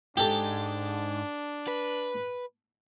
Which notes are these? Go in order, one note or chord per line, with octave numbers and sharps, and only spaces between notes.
G#2 D4 G4 A4
B4